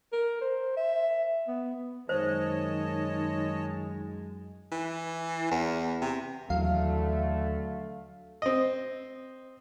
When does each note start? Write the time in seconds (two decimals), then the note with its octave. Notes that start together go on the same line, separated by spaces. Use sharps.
0.13 A#4
0.42 C5
0.77 E5
1.47 B3
2.09 F#2 D#3 G#3 C5 C#5 D#5 A5
4.72 E3
5.51 E2
6.01 C3
6.50 D#2 D3 E3 F#3 A3 F5
8.42 C4 D#5